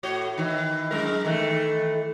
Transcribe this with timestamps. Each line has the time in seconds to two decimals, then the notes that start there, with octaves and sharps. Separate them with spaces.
0.03 A2 F#4 C#5
0.38 D#3 E3
0.91 F#2 G#3 A#4
1.25 D#3 E3 A3